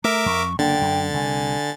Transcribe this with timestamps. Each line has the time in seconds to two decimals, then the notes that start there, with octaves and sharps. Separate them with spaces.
0.04 A3 A#4 E5 A#5 D6
0.26 F2 C#6
0.59 F#1 D3 A#3 D4 G5 A6
0.81 F#2
1.14 C2 G#5